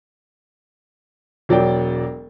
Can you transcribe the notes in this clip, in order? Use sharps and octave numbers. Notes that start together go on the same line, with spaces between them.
E1 F#3 D5 G5